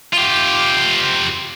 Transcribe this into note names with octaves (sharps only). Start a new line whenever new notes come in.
F4 G4